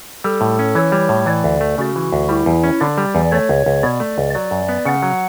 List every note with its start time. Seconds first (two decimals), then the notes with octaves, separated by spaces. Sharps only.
0.24 G3 A4
0.41 A2
0.59 C#4
0.75 E3 C#5
0.92 G3
1.09 A2
1.26 E3 D5
1.44 D2
1.61 A3
1.78 C#3 F#4
1.96 E3
2.12 D2
2.29 G3 E4
2.46 E2
2.64 C#4
2.81 D3 D5
2.98 G3
3.15 E2
3.32 A3 C#5
3.49 C#2
3.66 C#2
3.83 B2 D5
4.00 A3
4.18 C#2
4.34 F#3 D5
4.51 F#2
4.69 B3
4.85 C#3 F#5
5.03 F#3